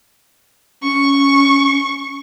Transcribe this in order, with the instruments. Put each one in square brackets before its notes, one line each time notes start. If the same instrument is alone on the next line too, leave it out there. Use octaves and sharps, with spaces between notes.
[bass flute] C#4 [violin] C#6